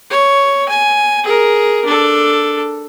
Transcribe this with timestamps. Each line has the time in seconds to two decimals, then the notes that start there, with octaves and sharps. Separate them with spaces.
0.10 C#5
0.68 G#5
1.24 G#4 A#4
1.85 D4 A4